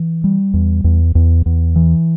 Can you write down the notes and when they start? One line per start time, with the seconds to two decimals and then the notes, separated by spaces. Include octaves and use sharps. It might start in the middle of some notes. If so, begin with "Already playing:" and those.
Already playing: E3
0.24 G3
0.54 E2
0.84 E2
1.15 E2
1.46 E2
1.76 E3